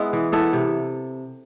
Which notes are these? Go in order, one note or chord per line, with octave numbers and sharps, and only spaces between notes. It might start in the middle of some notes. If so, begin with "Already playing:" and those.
Already playing: G#3 B3 E4
E3
B3 E4 A4
C3